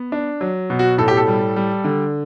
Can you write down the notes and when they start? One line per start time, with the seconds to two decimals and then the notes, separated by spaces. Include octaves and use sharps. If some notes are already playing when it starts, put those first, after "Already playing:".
Already playing: B3
0.12 D4
0.41 F#3
0.70 B2
0.79 F#4
0.98 A2 A4
1.08 G4
1.17 A4
1.28 G3
1.56 G3
1.84 D3